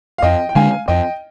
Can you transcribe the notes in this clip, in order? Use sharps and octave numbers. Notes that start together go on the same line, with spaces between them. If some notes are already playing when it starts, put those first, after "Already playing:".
F5
F2 D#5 G5
G5
D3 G#3 D4 F5 G#5
F2 D#5 G5